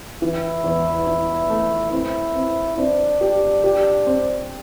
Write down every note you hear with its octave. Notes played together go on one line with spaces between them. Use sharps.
E3 E4
E2
E3
A3
C4 E4
C4
C4 D4
G4
G4
C4